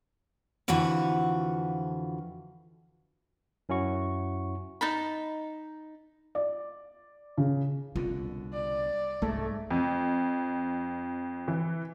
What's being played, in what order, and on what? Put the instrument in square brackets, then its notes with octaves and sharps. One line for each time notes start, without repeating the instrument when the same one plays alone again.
[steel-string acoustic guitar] F2 D3 E3 F3 F#4
[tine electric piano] F#2 C#4 E4 F#4 C#6
[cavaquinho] D#4 A5 B5
[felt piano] D5
C#3
[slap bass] C2 B2 D3 [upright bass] F4
[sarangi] D5
[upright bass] C2 G#3 [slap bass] G#2 [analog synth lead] A3
[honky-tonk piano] F2
E3